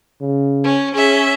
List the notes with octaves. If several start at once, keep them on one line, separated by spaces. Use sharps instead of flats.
C#3
C#4
C#4 G#4 E5